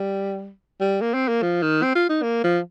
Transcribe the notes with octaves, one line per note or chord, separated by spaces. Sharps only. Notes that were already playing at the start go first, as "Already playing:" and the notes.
Already playing: G3
G3
A#3
C4
A#3
F3
D#3
C4
F4
D#4
A#3
F3